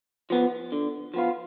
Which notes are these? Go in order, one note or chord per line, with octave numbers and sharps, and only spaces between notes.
F3 B3
D3
F3 B3 F4